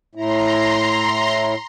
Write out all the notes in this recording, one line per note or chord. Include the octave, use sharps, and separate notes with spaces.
A2 E4 A#5 C6